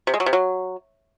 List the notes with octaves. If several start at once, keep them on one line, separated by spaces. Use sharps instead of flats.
C3
G#3
F#3
C3
F#3